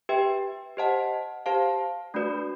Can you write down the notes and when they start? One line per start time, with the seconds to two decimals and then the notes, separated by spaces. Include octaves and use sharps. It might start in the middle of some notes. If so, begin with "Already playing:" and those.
0.09 G4 B4 E5 G5
0.77 G4 C5 D#5 F#5 A5
1.46 G4 C5 F5 A5
2.14 A3 D4 F#4 B4 D5